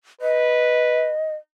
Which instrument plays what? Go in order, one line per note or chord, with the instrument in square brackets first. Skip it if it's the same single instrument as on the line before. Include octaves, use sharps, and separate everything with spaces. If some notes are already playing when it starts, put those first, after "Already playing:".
[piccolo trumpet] B4 [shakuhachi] D#5